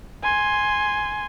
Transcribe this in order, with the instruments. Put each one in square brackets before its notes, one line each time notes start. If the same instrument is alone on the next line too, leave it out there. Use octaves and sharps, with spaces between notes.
[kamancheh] G#5 C6